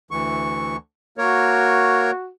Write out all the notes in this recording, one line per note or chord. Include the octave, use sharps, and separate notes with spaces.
D2 E3 C#6
A#3 F#4 A#4 C#5